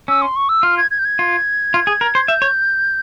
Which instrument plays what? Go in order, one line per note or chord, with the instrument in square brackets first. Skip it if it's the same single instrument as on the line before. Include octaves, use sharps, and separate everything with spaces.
[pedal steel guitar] C#4 [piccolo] E6
[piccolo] C6
C#6
E6
[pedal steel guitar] F4 [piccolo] F6
[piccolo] G#6
G#6
G6
G#6
[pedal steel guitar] F4
F4
G#4
A#4
C5
[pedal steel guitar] E5 [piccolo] G6
[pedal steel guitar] C#5